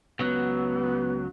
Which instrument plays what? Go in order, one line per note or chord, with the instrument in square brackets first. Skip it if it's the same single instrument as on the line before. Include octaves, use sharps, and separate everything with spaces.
[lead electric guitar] C#2 F#3 [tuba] B3